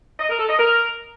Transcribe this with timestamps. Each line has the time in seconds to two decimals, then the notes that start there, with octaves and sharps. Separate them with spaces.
0.20 D#5
0.29 A#4
0.39 A4
0.49 D#5
0.59 A#4